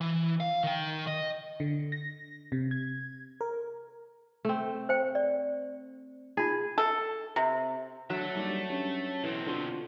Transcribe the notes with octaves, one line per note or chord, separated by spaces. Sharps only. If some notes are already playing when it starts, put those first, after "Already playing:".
E3
F5
D#3 G5
D#5
D3
A#6
C3
G#6
A#4
A3 C4
C5 G5
D5
D#4 F4 G#4
A4
C3
D3 F#3 A4 E5
D#2 G3 D4
G2 C#4
B2 E3 C4
D3 F4 F#4 C5